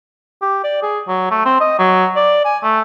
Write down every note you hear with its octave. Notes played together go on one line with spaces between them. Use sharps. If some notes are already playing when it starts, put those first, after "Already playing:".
G4
D5
G#4
F#3
A3
C4
D#5
F#3
D5
G#5
A3